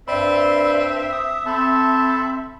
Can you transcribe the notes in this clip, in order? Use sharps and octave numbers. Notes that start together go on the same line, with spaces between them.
G2 C4 D5 E5 B5
D#6
C4 A4 A5 B5